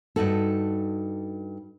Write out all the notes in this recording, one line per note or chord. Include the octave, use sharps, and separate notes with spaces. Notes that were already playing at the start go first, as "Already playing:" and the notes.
G2 D#4 F#4 A4